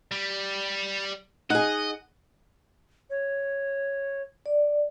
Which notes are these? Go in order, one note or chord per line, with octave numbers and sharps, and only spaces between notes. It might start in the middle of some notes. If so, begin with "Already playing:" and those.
G3
D#4 G#4 D#5 F#5 F#6
C#5
D5